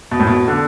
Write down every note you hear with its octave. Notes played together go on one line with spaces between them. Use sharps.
B2
A2
B2
D3